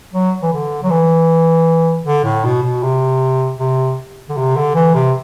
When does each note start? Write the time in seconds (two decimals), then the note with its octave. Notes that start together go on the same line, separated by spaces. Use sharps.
0.13 F#3
0.42 E3
0.53 D3
0.83 F#3
0.90 E3
2.06 D3
2.25 A2
2.44 B2
2.63 B2
2.83 C3
3.59 C3
4.29 D3
4.37 C3
4.56 D3
4.75 E3
4.95 C3